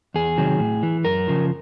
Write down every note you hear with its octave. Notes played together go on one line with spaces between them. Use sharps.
E2 G#4
C3 D#3 F#3
A2
E3
F#2 A#4
C#3 F3